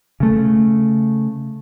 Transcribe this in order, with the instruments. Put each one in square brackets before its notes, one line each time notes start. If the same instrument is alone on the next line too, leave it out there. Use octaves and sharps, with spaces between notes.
[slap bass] C#3 A3